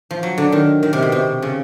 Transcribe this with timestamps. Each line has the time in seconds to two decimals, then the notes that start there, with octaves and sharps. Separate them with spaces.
0.11 F3
0.23 F#3
0.38 D3
0.52 D#3
0.83 D#3
0.93 C3
1.02 B2
1.12 C3
1.42 C#3